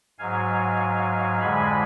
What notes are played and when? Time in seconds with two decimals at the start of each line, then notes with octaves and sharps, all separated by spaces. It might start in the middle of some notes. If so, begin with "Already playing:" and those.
0.19 G#2 F#3 F5 G#5
1.40 F2 D3 G#3 G#5 B5